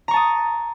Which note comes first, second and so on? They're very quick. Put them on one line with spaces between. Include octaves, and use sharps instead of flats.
A#5 C#6 A5 D#6